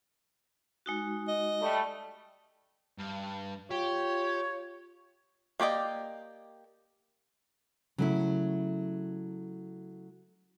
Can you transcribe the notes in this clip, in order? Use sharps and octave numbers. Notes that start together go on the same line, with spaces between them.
G#3 D#4 F#4
D#5
G3 A3
G2
F4 G4 C#5
A#3 G4 D5 D#5
C#3 F#3 A3 E4